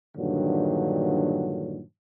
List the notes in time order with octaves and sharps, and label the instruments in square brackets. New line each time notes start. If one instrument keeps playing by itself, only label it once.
[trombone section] G2 A#2 D3 D#3 F#3